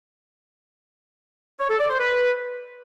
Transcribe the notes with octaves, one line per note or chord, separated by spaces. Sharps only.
C#5
A4
D5
C5
B4